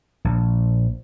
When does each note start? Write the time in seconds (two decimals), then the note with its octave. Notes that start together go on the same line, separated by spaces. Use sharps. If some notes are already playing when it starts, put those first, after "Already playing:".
0.25 A#1